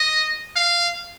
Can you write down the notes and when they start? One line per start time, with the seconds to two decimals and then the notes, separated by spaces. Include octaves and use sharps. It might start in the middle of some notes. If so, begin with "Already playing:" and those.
Already playing: D#5
0.56 F5